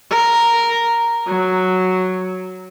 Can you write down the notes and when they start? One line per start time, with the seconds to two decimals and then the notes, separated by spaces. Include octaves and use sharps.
0.11 A#4
1.27 F#3